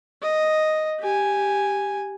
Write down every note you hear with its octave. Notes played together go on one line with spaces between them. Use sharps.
D#5
G4 G#5